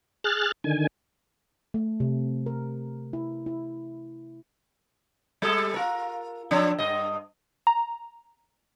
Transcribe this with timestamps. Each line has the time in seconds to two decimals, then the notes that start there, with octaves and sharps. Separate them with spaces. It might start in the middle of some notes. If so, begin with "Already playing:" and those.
0.24 G#4 F6 F#6 A6
0.64 D3 D#3 G#5
1.74 A3
2.00 C3
2.46 A#4
3.13 E4
3.46 E4
5.42 G3 G#4 A4
5.74 F4 A#4
6.51 F3 D4
6.79 G2 D#5
7.67 A#5